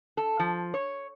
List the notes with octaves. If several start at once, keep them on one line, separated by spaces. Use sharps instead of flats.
A4
F3
C#5